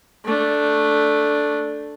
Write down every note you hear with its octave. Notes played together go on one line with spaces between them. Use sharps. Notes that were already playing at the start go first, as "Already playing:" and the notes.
A3 D4